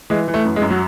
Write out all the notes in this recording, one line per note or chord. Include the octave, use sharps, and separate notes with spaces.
E3 G#3
E3
A3
F#2
G#3
F#2
F#3